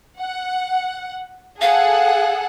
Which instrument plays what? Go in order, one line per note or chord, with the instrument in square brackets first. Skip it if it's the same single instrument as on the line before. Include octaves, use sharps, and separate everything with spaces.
[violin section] F#5
[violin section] G#4 A4 F#5 [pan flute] F5